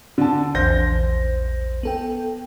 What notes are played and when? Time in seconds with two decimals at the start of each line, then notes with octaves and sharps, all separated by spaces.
0.18 D3 A5
0.55 A#1 E2 C5 G6 A#6
1.83 B3 A4 G5